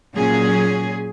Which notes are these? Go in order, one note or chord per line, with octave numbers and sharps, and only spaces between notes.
A#2 F#3 C#4 G#4